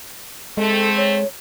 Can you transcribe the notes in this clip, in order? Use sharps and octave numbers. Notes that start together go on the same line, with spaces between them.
G#3 A3 C4 A4
C#5